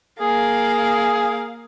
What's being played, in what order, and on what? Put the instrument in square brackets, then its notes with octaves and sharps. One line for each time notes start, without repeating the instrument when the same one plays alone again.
[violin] A#3 F5 [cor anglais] G#4